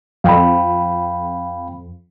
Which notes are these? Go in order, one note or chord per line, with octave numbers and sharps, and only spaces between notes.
F2 F5 G5 B5